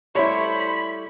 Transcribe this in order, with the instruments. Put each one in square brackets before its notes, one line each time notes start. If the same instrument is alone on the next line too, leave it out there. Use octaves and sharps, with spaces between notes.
[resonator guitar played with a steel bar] G3 A3 E4 [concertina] C5 C#6 [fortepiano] C#5 [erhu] B5